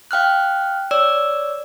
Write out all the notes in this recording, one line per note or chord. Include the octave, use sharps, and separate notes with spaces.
F5 G5 F6 F#6
C#5 D5 E6